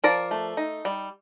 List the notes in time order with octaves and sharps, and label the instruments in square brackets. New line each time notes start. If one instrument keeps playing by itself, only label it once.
[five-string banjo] F3 A#4 D5
A3
D#4
G3